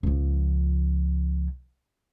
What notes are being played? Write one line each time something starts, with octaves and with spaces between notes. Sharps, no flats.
C#2 F3